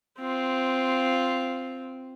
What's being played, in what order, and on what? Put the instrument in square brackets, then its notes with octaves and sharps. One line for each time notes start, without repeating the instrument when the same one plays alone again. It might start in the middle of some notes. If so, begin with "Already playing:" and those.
[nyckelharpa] C4 F4